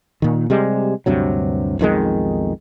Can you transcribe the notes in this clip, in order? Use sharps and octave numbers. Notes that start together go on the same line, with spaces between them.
A#2 D#3
C3 G3 G#3
D2 G2 C3 F#3
B1 F2 D#3 G#3